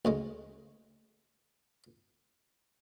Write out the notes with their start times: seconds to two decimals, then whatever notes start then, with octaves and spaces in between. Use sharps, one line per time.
0.05 D2 C#3 G#3